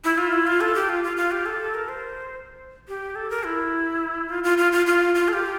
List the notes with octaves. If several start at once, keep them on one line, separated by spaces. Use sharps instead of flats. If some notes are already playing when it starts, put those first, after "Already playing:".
E4
F4
E4
F4
A4
G4
F4
F4
F4
G4
A4
A#4
C5
G4
A4
A#4
E4
F4
F4
F4
F4
F4
F4
A4
G4